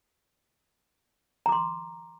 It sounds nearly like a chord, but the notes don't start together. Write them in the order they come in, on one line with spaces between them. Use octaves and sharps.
A#5 D6 C6